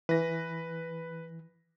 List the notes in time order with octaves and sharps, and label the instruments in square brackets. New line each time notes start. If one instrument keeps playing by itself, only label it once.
[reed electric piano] E3 [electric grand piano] B4 A#6